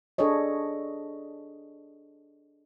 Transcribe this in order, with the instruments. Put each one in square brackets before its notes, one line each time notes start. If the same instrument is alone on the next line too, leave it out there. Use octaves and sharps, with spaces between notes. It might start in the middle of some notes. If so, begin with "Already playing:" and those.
[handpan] D4 G#4 A4 C#5 D#5